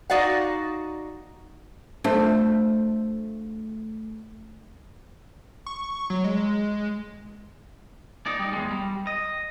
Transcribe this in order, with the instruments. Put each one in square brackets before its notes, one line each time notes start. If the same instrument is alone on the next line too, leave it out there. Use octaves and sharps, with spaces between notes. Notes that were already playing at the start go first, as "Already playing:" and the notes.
[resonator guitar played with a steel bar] D#4 F#4 D5 F5 F#5
[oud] A3 [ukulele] D4 F4 C5
[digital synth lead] C#6
F#3
G#3
[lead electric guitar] D#4 D5
G3 D#4
E2 G#3
G3
D#5